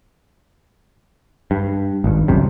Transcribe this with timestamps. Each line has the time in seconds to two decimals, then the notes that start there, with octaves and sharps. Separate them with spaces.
1.51 G2
2.04 G#1 G2
2.28 F#1 C2 F#2 C3